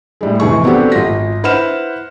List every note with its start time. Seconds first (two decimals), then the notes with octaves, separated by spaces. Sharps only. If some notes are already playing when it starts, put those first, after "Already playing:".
0.21 A2 G3 G#3
0.40 F1 E3 G#4 C#6
0.64 B3 C4 D4 F#4 G4 A4
0.92 G#1 F4 A#6
1.44 E4 B4 C5 F#5 F6 E7